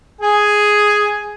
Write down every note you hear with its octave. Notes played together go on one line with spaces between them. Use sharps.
G#4 G#5